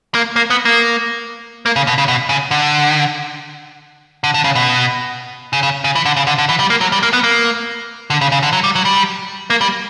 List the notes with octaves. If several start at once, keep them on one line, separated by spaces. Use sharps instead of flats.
A#3
A#3
B3
A#3
A#3
C#3
B2
C#3
B2
C#3
D3
D3
D3
C#3
B2
C#3
C#3
C#3
E3
D3
C#3
D3
D3
E3
G3
A#3
F#3
G3
A#3
B3
A#3
D3
C#3
C#3
D3
F#3
G3
F#3
G3
A#3
G3